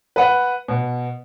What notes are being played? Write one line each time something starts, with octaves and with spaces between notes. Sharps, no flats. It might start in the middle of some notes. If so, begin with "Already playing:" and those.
B4 F#5
B2